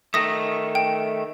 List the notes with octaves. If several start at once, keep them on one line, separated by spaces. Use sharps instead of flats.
D#3 A3 D#6 A#6
G5